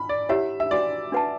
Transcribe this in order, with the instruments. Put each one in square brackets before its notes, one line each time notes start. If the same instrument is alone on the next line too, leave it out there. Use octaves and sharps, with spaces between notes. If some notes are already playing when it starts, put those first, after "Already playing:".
Already playing: [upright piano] B5
D5
[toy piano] E4 G4 C#5 F#5 [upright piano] E5
[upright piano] E5
[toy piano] D4 F#4 B4 F#5 [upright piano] D5
[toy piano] D4 F#4 B4 F#5 A5